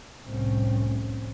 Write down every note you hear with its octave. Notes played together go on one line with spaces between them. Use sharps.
F1 C2 A2 C4 C#4